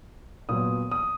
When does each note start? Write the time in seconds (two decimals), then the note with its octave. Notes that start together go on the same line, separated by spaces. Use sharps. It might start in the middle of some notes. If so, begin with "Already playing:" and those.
0.49 A#2 F#3 B3 D#6
0.91 D#6